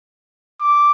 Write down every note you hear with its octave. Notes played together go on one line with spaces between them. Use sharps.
D6